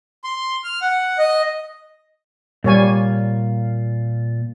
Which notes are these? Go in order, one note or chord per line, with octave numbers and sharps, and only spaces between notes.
C6
F6
F#5
D#5
A#2 G3 F4 C#5 G#5